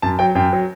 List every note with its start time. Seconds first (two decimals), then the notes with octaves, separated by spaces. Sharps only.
0.02 F#2 A5
0.19 F#3 G5
0.35 F#2 G5
0.53 F#3